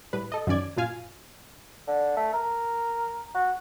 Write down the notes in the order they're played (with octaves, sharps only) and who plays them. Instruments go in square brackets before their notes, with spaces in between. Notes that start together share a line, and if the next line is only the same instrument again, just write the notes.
[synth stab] A2 G3 B4
A4 D#5
F#2 D#3 C#4 D5 G#6
F#2 A#2 F4 F5 G#5
[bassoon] D3
A3
A#4
F#4